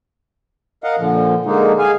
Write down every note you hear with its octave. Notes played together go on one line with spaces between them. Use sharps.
A#4 D#5 F5 F#5
A#2 D3 F3
D3 G#3 A#3 D#4
G#4 F5 G#5